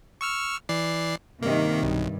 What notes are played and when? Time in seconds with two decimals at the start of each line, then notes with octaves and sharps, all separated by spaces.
0.21 C#6 E6 F6
0.69 E3 D5 C7
1.42 G2 C3 D#3 A#3
1.83 B1 G2